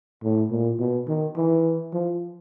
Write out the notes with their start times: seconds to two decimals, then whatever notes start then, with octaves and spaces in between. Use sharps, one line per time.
0.23 A2
0.51 A#2
0.80 B2
1.08 D#3
1.37 E3
1.93 F3